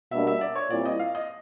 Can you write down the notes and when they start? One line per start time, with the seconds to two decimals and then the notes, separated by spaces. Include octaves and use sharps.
0.11 B2 G3 A#3 D4 E5
0.27 E5
0.41 D5
0.55 C#5
0.70 A#2 G3 C4 E4 D5
0.85 D#5
0.99 F5
1.15 D#5